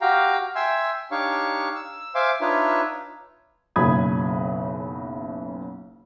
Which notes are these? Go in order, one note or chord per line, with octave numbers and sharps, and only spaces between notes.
F#4 G4 F5 G5 A#5
E5 G5 G#5 C6 E6
D4 D#4 G4 C#5 F5 C#6
E6
C5 E5 F5 G#5 C6 D6
D4 D#4 F4 B4 C#5 E5
F#1 B1 C#3 B5 D#6 G#6